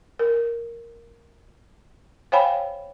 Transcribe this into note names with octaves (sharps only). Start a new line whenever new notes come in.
A#4
C5 C#5 F5 G5 G#5 B5